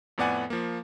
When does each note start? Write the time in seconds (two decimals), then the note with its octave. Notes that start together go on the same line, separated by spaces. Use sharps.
0.18 F2 A2 B3 D5 F#5 G#5
0.50 F3 A#3